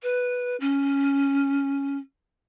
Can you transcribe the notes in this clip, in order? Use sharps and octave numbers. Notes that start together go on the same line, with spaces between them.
B4
C#4